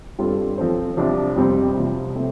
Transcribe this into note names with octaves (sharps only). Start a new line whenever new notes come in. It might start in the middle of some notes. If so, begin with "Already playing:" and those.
G2 G3 C4 F4 A4
F3 C4 A4 C5
C2 C3 F3 D4
F2 C3 G3 C4
C2 C3 F3
C3 A3 C4